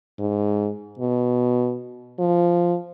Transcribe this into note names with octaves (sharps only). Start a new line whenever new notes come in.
G#2
B2
F3